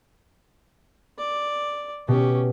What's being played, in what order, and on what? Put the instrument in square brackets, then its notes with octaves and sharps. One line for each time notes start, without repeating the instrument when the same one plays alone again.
[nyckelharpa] D5
[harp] B2 [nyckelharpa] C#4 G4